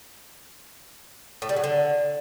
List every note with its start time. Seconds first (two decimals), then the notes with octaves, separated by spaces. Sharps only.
1.42 A2
1.49 G3
1.56 F#3
1.64 D3